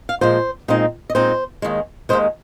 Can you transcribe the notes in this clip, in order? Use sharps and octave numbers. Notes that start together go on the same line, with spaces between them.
F5
A#2 F3 G#3 C5
A#2 G#3 C4 D#4
D#5
A#2 G#3 C4 D#4 C5
D#2 D#3 G#3
D#2 D#3 G#3 C5